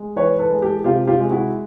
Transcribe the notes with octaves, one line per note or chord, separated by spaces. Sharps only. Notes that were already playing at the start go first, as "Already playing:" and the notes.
Already playing: G#3
E3 B4 C#5
A4 B4
G#3
G4 A4
C3 F4 G4
F4 G4
G#3
E4 F#4